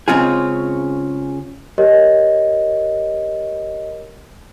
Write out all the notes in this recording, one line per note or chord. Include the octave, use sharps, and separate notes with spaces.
C#3 G#3 C4 C#4 F4 G#4
G4 A#4 C#5 D#5